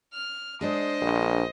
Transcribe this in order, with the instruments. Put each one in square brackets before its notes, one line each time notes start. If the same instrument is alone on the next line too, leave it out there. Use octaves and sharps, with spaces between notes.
[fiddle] F6
[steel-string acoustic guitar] G#3 D4 G#4 [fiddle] C5 D#5
[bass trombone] A#1